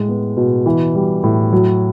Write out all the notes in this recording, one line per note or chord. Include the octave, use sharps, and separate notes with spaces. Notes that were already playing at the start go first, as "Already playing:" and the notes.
Already playing: A2 G#3
B3
B2
E3
G3
A2
F#3